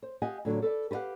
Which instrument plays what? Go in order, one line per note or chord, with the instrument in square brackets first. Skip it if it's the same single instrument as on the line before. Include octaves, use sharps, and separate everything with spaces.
[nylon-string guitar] C5
G4 D#5 F5 F#5 G#5
A2 D3 F#3
A4 B4 D5
G4 B4 D5 F5 F#5